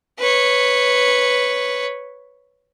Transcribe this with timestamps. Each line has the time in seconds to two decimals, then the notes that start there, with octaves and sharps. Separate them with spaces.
0.19 B4 C#5